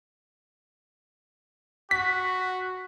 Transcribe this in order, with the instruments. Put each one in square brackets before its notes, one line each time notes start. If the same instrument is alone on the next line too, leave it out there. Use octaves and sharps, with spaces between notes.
[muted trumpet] F#4 [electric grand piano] B6